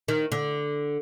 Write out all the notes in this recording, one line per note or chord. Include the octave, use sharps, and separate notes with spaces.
D#3
D3